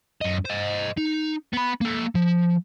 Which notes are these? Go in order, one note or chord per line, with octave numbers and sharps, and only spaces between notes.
F#2 D#5
C5 D#5
D#4
B3 B5
A#3 A4
F3